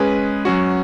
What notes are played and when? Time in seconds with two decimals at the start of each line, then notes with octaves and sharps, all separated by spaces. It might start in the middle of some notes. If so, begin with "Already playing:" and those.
Already playing: G#3 C#4 G#4 B4
0.45 F#3 C#4 F#4